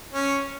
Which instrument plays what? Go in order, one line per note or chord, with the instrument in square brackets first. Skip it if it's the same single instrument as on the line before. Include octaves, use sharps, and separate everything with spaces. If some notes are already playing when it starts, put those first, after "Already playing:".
[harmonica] C#4